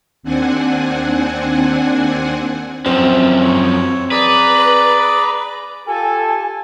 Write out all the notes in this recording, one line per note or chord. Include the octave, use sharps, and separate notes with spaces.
D#2 C4 D4 F#5 G#5
F#2 F3 C4
C#5
G#4 B4 D5 A#5
F4 G4 A4 G#5